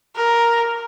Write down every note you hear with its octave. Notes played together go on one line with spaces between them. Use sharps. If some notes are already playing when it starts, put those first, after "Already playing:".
A#4